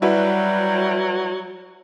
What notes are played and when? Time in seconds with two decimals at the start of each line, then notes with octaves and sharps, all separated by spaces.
0.02 F#3 G3 E4 F#4 B4